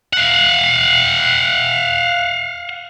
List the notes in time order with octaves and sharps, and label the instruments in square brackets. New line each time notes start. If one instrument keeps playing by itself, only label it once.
[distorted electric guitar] F5 F#5